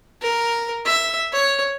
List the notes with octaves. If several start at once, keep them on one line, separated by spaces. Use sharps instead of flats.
A#4
E5
C#5